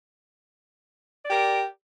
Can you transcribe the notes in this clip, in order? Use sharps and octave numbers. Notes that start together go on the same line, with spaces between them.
G4 A#4 D5